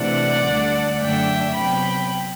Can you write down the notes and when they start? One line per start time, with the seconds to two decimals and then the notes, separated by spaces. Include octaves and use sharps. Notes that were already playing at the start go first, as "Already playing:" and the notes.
Already playing: C3 E3 A3 D4 D5 F#5
0.46 D2 D3 G3 D4
1.01 F#2 D3 A3 D4 E5 G5
1.55 C3 F#3 B3 G5 B5